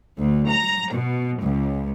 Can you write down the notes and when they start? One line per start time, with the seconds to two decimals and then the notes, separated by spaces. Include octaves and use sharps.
0.18 D2
0.49 A#5
0.94 B2
1.41 C#2